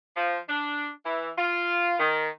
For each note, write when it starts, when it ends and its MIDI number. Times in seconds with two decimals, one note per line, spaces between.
0.16 0.38 53
0.49 0.88 62
1.05 1.30 52
1.37 1.96 65
1.99 2.28 51